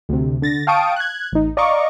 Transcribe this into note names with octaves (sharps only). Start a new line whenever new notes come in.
D2 C3
D3 A6 A#6
F5 G5 A5 C#6 D#6 D7
F#6 G#6
A1 D#4
D5 D#5 F5 A#5 C#6 D6